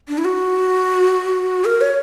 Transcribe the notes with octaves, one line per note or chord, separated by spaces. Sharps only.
D4
E4
F#4
A#4
C#5